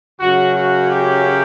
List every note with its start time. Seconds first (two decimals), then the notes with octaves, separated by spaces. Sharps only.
0.20 F#2 C#3 F#3 F#4
0.55 F#4
0.90 G4